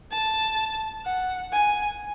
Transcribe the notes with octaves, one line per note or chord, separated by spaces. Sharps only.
A5
F#5
G#5